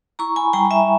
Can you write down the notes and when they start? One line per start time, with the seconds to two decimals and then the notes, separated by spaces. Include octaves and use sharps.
0.19 E4 A#5 C#6
0.36 G#5 B5
0.53 G3 G5 A#5
0.65 A#5
0.71 E5 G#5